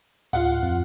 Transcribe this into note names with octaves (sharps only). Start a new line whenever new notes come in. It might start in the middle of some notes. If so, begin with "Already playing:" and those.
D2 A2 F4 F#5
F2 C4